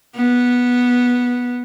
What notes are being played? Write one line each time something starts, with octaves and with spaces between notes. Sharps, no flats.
B3